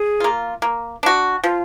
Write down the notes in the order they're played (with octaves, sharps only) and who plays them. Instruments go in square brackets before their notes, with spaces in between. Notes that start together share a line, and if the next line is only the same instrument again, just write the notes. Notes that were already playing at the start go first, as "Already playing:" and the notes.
Already playing: [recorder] G#4
[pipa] A#3 F4
A#3
D4 F#4
[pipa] F3 [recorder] F4